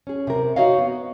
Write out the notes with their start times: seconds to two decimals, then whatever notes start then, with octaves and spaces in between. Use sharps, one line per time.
0.07 C#4 G#4
0.27 C3 A#4
0.56 D#4 F#4 C#5 D#5 F5
0.78 B3